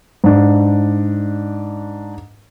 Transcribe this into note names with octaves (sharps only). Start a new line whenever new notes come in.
G#2 D4